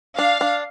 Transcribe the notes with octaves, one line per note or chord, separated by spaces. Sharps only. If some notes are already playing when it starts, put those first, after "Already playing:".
D4 F5
D4